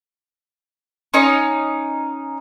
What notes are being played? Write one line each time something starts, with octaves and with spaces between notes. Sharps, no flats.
C#4 D#4